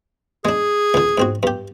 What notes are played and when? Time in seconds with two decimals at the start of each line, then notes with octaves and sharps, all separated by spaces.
0.45 G#3 D4 G#4
0.94 C#2 D3
1.18 G#2 C4 F#4
1.43 G2 G4